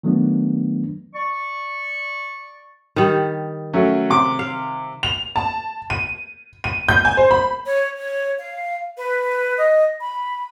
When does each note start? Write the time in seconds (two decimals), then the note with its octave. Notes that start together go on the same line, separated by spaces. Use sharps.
0.03 D#3 F#3 A3 B3 D4
1.14 D5 C#6
2.96 D#3 G3
3.73 F#3 A3 C#4
4.10 C3 D6
4.39 F5
5.03 F7
5.36 A5
5.90 D#7
6.64 D#7
6.89 G6
7.05 G#5
7.17 C5
7.31 B5
7.66 C#5
7.98 C#5
8.38 F5
8.97 B4
9.58 D#5
10.00 B5